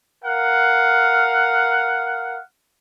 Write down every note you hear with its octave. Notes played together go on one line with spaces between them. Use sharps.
A#4 F5 F#5